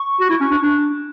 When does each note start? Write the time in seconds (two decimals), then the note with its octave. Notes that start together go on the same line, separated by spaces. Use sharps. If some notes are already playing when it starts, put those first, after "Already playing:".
Already playing: C#6
0.20 F#4
0.30 E4
0.40 C#4
0.51 D4
0.62 D4